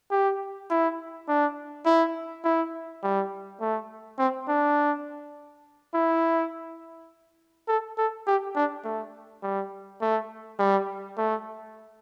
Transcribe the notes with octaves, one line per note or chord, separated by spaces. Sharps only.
G4
E4
D4
E4
E4
G3
A3
C4
D4
E4
A4
A4
G4
D4
A3
G3
A3
G3
A3